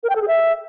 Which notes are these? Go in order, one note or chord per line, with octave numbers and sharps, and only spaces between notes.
A#4
G5
A4
G#4
E5